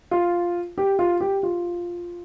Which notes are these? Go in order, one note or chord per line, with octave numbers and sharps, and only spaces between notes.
F4
G4
F4
G4
F4